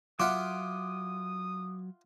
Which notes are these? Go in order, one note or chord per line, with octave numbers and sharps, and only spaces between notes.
F#3 F4 E5 F#5 D6 D#6